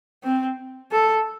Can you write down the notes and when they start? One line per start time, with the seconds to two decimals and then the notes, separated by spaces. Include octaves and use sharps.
0.24 C4
0.92 A4